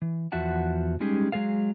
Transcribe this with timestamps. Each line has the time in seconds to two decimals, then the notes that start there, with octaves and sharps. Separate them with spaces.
0.02 E3
0.32 E2 F3 F#4 E5 F#5 A5
1.00 G3 G#3 C#4 D#4 G4 G#4
1.32 F#3 G#3 G#4 A4 F5